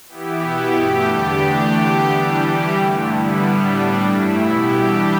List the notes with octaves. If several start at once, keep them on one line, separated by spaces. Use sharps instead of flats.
E3 B3 E4 G4
B2 B3 E4 G4
G2 E3 A3 G4
E2 D3 B3 D4 G4
E3 A3 D4 G4
D3 B3 G4
E3 G3 D4 G4
E3 G3 E4 G4
G2 D3 A3
D3 G3 B3 E4
A2 G3 B3 D4
A2 G3 D4
G2 E3 A3 E4
B2 B3 E4 G4
E3 G3 D4 G4